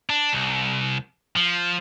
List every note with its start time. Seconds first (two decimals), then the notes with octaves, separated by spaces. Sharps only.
0.09 D4
0.33 C2
1.36 F3